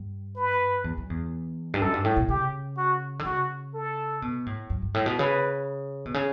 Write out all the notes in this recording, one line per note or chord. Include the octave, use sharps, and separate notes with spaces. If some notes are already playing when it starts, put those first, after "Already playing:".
Already playing: G2
B4
E2
F#2
E2
G2
F#2 A4
G2
A2
B2
C#3 G4
F#4
D3
C#3 F#4
A4
B2
A2
F#2
G2
A2
B2
C#3 B4
B2
C#3